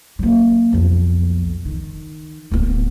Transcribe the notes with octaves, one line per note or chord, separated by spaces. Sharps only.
F#3 A#3
B1 F2
D#3
D1 B3